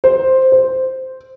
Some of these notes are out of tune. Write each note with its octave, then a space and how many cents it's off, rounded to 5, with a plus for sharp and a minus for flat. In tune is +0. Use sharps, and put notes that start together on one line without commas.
C5 +0
C5 -5